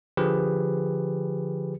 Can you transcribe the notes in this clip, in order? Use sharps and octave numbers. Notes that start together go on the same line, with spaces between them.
D3 F3 G4 G#4 B4